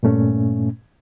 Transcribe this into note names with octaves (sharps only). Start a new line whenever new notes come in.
G2 A#2 A3 C#4